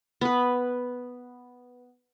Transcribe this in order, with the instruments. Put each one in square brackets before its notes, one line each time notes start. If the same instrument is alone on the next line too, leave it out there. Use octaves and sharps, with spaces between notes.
[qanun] B3 B4